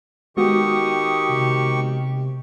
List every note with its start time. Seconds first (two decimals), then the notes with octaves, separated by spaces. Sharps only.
0.37 D#3 G#3 B3 F#4 G4 C#6 D#6
1.29 C3